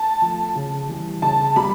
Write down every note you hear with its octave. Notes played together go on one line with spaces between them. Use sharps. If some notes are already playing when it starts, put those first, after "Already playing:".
Already playing: A5
F3 A3
C#3
E3 G3
C#3 A5
G3 B5